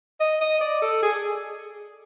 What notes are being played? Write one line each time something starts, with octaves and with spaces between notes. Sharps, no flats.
D#5
D#5
D5
A4
G#4